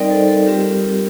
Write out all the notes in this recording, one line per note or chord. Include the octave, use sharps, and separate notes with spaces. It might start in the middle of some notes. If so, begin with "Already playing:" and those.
Already playing: G3 C4 D#4 A#4 D5 D#5 G5
A4 C5
A4
G3 C4 F4 G4 A#4